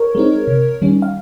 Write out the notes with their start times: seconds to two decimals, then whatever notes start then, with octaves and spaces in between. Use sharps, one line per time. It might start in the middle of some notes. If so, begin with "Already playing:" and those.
Already playing: A#4 C#5
0.15 G#3 C4 D#4
0.48 C3
0.82 D#3 G3 C#4
1.02 F5